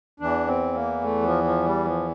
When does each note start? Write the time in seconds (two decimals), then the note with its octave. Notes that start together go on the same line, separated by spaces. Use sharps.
0.20 E2 E3 D4
0.47 C4
0.75 A#3
1.02 A3
1.23 F3
1.44 F3
1.64 G3
1.85 F3